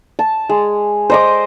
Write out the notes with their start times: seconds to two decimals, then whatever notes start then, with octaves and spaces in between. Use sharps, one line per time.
0.19 A5
0.49 G#3
1.10 C5 D#5 D6